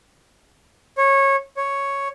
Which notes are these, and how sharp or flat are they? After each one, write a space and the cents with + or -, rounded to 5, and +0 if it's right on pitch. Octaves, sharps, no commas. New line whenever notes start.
C#5 -20
C#5 +0